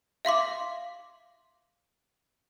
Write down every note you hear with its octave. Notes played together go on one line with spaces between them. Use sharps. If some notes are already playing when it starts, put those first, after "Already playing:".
E5 F5 C6 D6